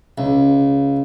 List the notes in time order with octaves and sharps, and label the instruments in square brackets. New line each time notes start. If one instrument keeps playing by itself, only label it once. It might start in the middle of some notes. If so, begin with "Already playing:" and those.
[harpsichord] C#2